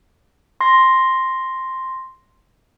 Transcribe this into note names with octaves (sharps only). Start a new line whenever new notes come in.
C6 A#6